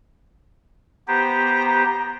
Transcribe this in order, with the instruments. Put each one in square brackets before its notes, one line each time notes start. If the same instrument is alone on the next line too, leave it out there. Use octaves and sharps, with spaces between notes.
[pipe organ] B3 G4 C5 [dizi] A#5